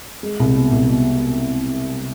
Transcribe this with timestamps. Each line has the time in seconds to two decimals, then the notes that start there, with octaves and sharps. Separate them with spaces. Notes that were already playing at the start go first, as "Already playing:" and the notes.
0.23 G#3
0.40 C2
0.56 B2
0.72 C2
0.89 B2